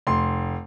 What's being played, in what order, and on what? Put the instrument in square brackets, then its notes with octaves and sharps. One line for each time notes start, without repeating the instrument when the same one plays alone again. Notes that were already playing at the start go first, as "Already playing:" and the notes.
[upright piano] F1 C6